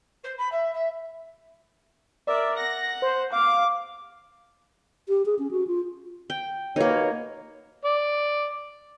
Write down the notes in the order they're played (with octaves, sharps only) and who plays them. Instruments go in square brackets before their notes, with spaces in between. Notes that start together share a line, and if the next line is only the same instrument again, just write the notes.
[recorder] C5
B5
E5
E5
[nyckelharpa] A#4 E5 [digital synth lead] D5
[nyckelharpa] F#5 [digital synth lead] A#6
[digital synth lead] C5
[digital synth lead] F5 [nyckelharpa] D6
[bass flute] G4
G#4
C#4
F#4
F4
[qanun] G5
[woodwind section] D#2 B2 C#5 [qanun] A#3 D#4
[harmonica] D5